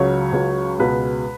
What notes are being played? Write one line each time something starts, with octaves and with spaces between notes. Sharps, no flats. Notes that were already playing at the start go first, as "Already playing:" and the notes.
Already playing: C#2 C#3 F#3 C#5
C#2 C#3 F#3
C#2 B2 G#3 B4